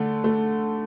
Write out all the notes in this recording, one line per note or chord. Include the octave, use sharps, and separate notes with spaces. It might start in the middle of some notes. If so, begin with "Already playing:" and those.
Already playing: D3 A3
A3